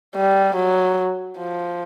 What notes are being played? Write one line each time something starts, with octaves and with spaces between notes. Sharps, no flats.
G3
F#3
F3